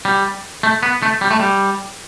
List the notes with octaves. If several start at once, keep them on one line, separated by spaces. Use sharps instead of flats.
G3
A3
B3
A3
G3
A3
G3